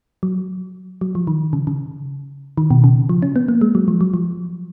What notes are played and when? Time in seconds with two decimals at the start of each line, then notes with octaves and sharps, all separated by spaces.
0.23 F#3
1.01 F#3
1.15 F3
1.27 D#3
1.53 C#3
1.67 C#3
2.58 D#3
2.71 B2
2.84 C#3
3.09 F3
3.22 C#4
3.36 B3
3.48 A#3
3.61 G#3
3.75 F#3
3.88 F3
4.01 F#3
4.14 F3